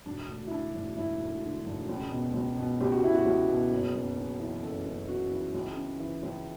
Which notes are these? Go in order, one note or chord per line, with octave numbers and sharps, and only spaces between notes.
E1 D4
D2
E4
D3 D4
E1
E1 E4
D2
D3
E1
C#2
B2
C#2
B2
C#2 G4
F#4
B2 E4
F#4
C#2
B2
F#1
F#2
C#3
E3
F#1 A4
F#2
C#3 F#4
E3
C#2
C#3
E3
C#2